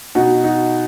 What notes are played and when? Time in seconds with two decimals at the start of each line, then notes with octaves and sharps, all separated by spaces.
0.15 B2 D#4 F#4
0.44 D#4 F#4